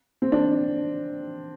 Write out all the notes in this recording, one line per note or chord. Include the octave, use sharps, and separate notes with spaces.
C4
D4